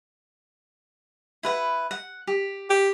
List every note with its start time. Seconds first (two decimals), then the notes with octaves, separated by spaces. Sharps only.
1.43 E4 B4 F#5
1.91 F#5
2.27 G4
2.70 G4